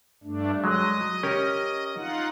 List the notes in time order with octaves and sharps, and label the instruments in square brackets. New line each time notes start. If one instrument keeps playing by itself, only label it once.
[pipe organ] G2 A3 D4
[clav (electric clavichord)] F#3 G#3 [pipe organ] D#5
[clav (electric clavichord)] C#4 G4 A#4
[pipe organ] D#4 F4 F#5